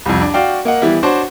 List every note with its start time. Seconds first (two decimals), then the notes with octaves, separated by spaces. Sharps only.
0.06 C2 F2
0.22 D4
0.34 F#4 D5 F5 G5
0.65 A#3 D#5 F#5
0.82 E3 G3 B3 E4
1.03 D4 F#4 C5 C#5